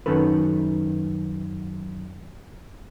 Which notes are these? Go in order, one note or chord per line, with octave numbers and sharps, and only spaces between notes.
F#2 D#3 C#4 A4 B4